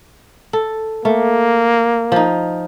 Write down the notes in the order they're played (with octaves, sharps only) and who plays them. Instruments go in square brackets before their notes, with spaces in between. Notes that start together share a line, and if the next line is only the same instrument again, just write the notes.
[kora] A4
[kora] A3 [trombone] A#3
[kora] F3 D#4